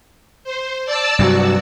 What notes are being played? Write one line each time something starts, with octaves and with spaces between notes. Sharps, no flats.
C5
D5 A5 E6
G2 C3 F#3 F#4